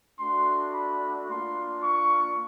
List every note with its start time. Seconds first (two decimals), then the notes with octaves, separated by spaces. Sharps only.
0.20 A3 D4 F#4 C6
0.74 B5
1.29 A#3 D4 F4 C6
1.83 C#6